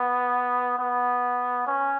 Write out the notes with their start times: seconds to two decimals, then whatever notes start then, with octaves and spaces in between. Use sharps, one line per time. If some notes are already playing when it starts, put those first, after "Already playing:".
Already playing: B3
0.79 B3
1.67 C#4